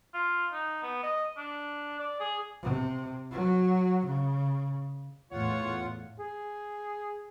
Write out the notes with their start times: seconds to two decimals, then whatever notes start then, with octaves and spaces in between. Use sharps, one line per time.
0.14 F4
0.52 D#4
0.83 B3
1.03 D#5
1.37 D4
1.99 D5
2.20 G#4
2.62 C3
3.31 F#3
4.06 C#3
5.32 E2 A2 F4 C#5 F#5
6.19 G#4